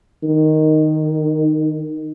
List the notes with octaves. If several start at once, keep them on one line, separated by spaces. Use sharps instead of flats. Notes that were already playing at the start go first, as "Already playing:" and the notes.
D#3